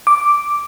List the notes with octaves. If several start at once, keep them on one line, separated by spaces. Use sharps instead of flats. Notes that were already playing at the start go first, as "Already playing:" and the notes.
D6